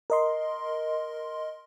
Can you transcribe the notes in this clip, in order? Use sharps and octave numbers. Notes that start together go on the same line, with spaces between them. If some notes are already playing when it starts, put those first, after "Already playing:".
A#4 D#5 C6